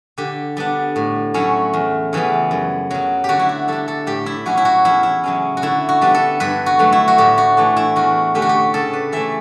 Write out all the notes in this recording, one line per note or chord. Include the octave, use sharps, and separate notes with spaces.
D3 G4
G3 B3 D4
A2
F#3 A3 C#4 E4
E2
C#3 E3 G3 B3
F#2
C#3 F#3
D3 F#4 G4
E4
F#4
G3 D4 A4
A4
A2 G4
E4
F#3 C#4 E4 F#4
E4
F#4
E2 E4
E4
C#3 F#3 C#4
F#4
D3 E4
F#4
G3 B3 D4
A4
G2 B4
F#4
D3 F#3 A3
E4
F#4
A2 G4
F#4
E3 A3 D4
E4
E2 F#4
D3 A3 C#4 G4
F#4
G4
C#3 A4
B4
E3 A3 E5